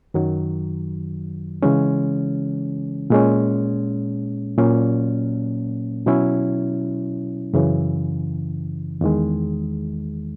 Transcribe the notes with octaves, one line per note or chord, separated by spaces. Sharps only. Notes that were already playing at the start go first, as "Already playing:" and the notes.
F#2 D#3 F#3
C#3 E3 G#3 C#4
A#2 G#3 C#4
A#2 F#3 A#3 C#4
B2 F#3 C#4 E4
F#2 C#3 E3
E2 D#3 G#3